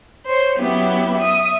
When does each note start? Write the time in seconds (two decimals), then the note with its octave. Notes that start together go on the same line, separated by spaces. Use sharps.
0.25 C5 C#5
0.56 F#3 B3 C#4 E4 G4
1.17 E5 D#6